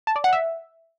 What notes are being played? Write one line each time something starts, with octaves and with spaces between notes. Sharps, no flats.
A5
D5
F#5
E5